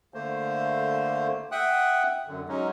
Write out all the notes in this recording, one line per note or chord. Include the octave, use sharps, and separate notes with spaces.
D3 A3 A#3 C5
E5 F#5 G5 D#6 F#6
F#2 D3
F#3 G#3 C#4 D#4